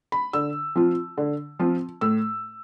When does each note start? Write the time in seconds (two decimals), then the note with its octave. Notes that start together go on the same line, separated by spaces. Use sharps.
0.12 B5
0.33 D3 E6
0.75 F3 C4 F4
1.18 D3
1.59 F3 C4 F4
2.01 A2 E6